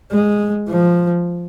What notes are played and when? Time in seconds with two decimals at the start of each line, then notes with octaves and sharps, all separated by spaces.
0.11 G#3
0.68 F3